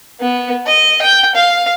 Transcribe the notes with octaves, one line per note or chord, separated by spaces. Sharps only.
B3
D#5
G5
F5